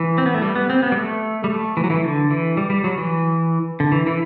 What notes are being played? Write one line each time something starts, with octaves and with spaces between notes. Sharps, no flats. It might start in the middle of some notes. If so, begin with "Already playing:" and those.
Already playing: E3
C4
B3
A3
G3
B3
C4
B3
G3
A3
G3
A3
E3
F#3
E3
D3
E3
G3
G3
F#3
E3
D3
E3
E3